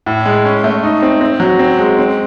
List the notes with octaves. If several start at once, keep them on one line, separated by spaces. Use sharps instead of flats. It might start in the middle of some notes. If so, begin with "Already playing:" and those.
A2
G#3
C#4
A3
D#4
C4
C4
F#3
C4
G#3
C4